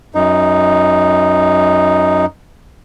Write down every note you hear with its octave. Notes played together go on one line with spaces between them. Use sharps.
F#2 D#4